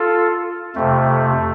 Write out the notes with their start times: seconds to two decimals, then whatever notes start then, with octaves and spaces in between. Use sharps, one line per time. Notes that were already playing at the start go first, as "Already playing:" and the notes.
Already playing: F4 A4
0.75 F2 C3 A3